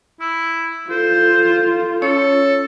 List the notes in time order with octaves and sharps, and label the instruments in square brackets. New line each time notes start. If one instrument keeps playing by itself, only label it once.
[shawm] E4 [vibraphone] E6
[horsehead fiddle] F4 [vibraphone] A4 [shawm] C5
[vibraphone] C#4 C#5 [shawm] A4